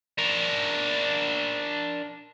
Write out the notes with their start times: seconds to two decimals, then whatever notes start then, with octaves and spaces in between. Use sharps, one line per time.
0.18 D4 A#4